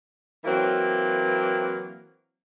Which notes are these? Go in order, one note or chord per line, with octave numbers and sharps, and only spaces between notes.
E3 F#3 A#3 C4